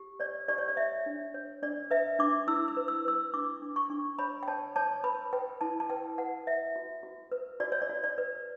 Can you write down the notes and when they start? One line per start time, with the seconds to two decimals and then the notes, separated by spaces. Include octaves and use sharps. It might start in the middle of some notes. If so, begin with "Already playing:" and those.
Already playing: G4
0.20 C#5 D5
0.48 G4 D5
0.58 C#5
0.68 D5
0.77 C#5 E5
1.06 D4
1.34 C#5
1.62 D4 D5
1.91 B4 E5
2.19 D4 D6
2.47 E4 E6
2.68 E6
2.77 B4
2.88 E6
3.05 B4 E6
3.34 D4 D6
3.62 D4
3.76 C#6
3.90 D4
4.19 C#5 B5
4.43 G5
4.48 C#5 A5
4.76 C#5 A5
5.04 B4 B5
5.33 B4 G5
5.61 E4 A5
5.80 A5
5.90 B4 G5
6.18 B4 F#5
6.47 B4 E5
6.76 F#4
7.03 F#4
7.32 B4
7.60 F#4 D5
7.72 C#5
7.82 D5
7.89 F#4
8.04 D5
8.18 B4